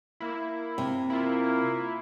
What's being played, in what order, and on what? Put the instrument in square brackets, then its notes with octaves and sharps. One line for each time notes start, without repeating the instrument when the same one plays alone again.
[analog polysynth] A#3 E4
[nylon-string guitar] C3
[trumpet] A#3 [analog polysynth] E4 F4